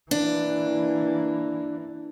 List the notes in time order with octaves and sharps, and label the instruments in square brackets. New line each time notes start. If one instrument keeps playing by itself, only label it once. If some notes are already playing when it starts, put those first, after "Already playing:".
[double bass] E3 A#3 [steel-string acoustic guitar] D4